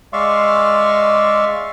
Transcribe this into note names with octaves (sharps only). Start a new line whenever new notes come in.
G#3 D5 E5 F5 C6 C#6